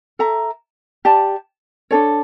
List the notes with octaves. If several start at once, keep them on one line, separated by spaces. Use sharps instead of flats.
A4 E5 A#5
G4 D5 A5
D4 A4 C#5